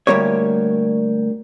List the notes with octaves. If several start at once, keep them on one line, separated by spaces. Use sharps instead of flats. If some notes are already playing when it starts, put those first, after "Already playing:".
D2 C3 G3 A#3 G4 C#5